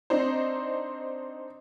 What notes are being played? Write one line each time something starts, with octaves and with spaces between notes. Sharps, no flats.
C4 D4 D#4 C5